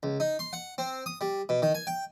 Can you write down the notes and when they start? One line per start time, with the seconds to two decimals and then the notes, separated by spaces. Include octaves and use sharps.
0.03 C#2
0.20 D#4
0.39 C6
0.53 F#5
0.78 C4
1.06 D#6
1.21 G3
1.49 B2
1.62 D#3
1.75 G#5
1.87 G5